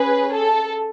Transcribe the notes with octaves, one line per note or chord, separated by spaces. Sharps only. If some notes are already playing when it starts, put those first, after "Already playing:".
Already playing: C#4 G#4 B4
A4